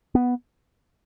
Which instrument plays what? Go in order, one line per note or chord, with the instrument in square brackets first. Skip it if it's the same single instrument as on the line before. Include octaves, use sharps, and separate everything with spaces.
[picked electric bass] B3